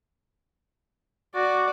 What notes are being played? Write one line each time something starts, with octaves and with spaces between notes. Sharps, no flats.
F#4 D5